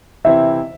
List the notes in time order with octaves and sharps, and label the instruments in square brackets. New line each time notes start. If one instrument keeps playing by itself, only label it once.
[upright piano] C3 E3 C4 E4 [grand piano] E5